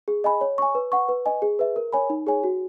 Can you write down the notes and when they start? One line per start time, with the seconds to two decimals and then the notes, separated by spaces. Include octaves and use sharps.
0.08 G#4
0.24 D#5 G#5 B5
0.41 C#5
0.58 G#5 C#6
0.75 B4
0.92 F#5 C#6
1.09 B4
1.26 D#5 G#5
1.42 G#4
1.59 B4 E5
1.76 A#4
1.93 C#5 G#5 B5
2.10 D#4
2.27 G#4 C#5 G#5
2.43 F#4